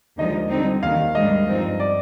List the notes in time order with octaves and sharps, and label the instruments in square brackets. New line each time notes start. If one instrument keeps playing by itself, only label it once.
[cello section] D#2 D3 F3 G#3 D#4 [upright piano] D#5
[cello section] D3 G3 C4 D#4
[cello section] D#2 D#3 G3 [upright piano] F5
[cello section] G#2 D#3 G3 D4 [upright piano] D#5
[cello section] G2 F3 C4 D#4
[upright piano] D5